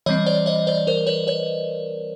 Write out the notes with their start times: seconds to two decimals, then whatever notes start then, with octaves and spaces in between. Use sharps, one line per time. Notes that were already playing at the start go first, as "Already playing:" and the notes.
0.06 E3 G3 C4 C#5 D#5
0.26 C5 D5
0.46 C#5 D#5
0.67 C5 D5
0.87 A#4 C5
1.07 B4 C#5
1.27 B4 C#5